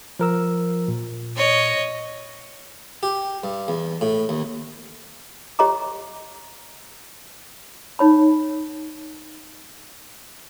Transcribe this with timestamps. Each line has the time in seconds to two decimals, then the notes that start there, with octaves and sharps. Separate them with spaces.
0.19 F3 A#4 E6
0.88 A#2
1.36 C#5 D#5
3.03 G4
3.44 G2
3.68 E2
4.01 A2
4.29 D#2
5.59 G4 C#5 D#5 A#5 D6
7.99 D#4 C#5 B5